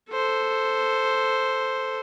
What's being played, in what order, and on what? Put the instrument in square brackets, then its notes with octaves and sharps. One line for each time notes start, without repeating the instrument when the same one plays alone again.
[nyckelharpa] A4 C5